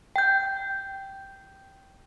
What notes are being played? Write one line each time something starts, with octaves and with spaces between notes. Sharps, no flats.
G5 G6